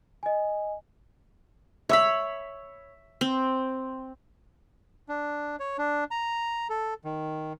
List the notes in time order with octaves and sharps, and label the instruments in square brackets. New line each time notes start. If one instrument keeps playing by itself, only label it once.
[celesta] D#5 G#5
[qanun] C#5 B5 [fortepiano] E5 E6
[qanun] C4
[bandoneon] D4
C#5
D4
A#5
A4
D#3